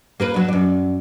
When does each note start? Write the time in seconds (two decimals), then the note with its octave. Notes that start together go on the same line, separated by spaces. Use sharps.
0.20 A#3 A#4 B4
0.34 F#3 D4
0.48 F#2 D5